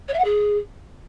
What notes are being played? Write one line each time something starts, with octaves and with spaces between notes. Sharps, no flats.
C#5
E5
F#5
G#4